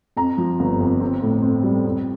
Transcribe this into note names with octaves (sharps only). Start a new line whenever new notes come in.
F2 A#5
F3
G1
F2
C4
A2
C4
G3
F2